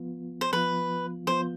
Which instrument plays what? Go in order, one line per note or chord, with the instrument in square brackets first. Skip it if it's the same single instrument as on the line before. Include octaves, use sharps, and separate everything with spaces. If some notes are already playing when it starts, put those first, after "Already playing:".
Already playing: [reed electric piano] F3 B3 F4
[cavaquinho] C5
[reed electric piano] F3 B3 F4 [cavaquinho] B4
[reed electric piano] F3 B3 F4 [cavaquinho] C5